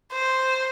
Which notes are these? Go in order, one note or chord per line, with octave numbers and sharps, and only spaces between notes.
C5